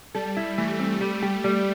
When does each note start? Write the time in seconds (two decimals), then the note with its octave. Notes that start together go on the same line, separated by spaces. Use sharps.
0.15 G3 A4
0.37 E4
0.58 E3 A3
0.79 C4
1.01 G3
1.22 G4
1.44 G3